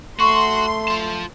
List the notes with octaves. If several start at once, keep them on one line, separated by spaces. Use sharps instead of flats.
A3 F#4 C6 C#6
F4 A5